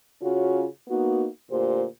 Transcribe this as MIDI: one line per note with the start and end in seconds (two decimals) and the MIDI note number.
0.21 0.64 49
0.21 0.64 61
0.21 0.64 65
0.21 0.64 66
0.87 1.26 58
0.87 1.26 59
0.87 1.26 63
0.87 1.26 66
1.50 1.85 38
1.50 1.85 46
1.50 1.85 67
1.50 1.85 72